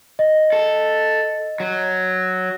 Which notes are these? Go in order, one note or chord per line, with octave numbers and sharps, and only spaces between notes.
D#5
A4
F#3